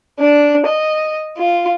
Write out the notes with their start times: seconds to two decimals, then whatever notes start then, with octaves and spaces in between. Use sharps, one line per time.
0.18 D4
0.65 D#5
1.36 F4